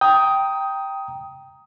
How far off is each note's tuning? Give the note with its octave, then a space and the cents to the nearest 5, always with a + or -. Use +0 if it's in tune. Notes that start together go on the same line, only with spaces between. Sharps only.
G5 +0 A#5 +0 D#6 +15